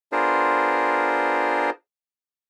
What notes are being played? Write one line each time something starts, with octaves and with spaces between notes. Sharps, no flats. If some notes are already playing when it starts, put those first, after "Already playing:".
B3 D4 F4 G#4 A#4 C5